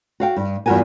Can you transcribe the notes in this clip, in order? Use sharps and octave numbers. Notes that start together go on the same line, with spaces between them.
F#4 F5 G5
G2
E2 G2 F4 F#4 A#4 G#5